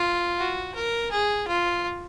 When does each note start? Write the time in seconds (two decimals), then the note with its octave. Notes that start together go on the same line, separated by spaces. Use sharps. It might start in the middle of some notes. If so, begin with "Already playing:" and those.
Already playing: F4
0.39 F#4
0.75 A#4
1.11 G#4
1.48 F4